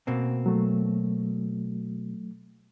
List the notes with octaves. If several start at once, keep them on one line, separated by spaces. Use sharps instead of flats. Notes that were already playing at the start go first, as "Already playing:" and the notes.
B2 A#3 C4
F#3 A3